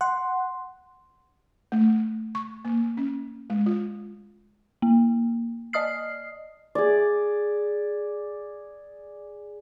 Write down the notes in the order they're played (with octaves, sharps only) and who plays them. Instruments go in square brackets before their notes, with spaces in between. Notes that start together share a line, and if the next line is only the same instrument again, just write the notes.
[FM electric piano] F#5 [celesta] C6
[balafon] A3
C#6
A#3
C#4
G#3
F4
[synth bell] A#3
D5 D#5 D#6 F6 C7
[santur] G#4 D5